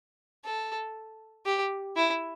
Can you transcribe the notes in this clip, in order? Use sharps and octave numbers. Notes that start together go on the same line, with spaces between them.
A4
G4
E4